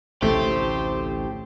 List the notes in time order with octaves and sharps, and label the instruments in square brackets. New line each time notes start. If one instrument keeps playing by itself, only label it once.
[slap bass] A1 D2 C3 [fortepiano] A3 [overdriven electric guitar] G4 [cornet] C5